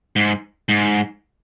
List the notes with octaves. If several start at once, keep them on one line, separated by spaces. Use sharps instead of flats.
G#2
G#2